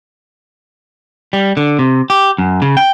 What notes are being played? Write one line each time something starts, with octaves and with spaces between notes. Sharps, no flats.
G3
D3
C3
G4
F#2
C#3
G5